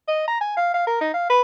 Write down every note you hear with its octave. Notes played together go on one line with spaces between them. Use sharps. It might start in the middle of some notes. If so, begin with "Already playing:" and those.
D#5
A#5
G#5
F5
F5
A#4
D#4
F5
B4